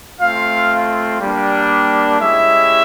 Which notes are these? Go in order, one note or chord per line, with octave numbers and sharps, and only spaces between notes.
A3 C4 F4 F5
G3 A#3 D4
G#3 C#4 E4 G4 E5